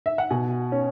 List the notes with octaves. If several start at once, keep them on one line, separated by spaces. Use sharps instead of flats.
E5
F#5
B2 G#5
C#4